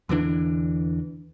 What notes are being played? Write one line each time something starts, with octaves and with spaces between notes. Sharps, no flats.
E2 D3 E3 D4